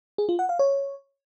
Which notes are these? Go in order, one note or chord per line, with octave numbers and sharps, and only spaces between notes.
G#4
F4
F#5
F5
C#5